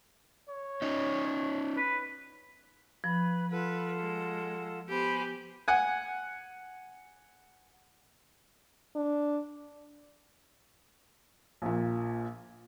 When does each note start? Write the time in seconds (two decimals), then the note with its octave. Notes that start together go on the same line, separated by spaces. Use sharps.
0.49 C#5
0.82 C#4 D#4
1.77 B4
3.04 F3 B4 B5
3.51 F4 A4 B4 F#5
3.99 G#3
4.89 B3 G4 C5 G#5 B5
5.68 F#5 G#5
8.95 D4
11.62 A#1 A#2